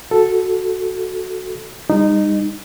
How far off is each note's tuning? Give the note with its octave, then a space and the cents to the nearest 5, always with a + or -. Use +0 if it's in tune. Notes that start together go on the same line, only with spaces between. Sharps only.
F#4 +0 A4 +0
G3 +45 D#4 -15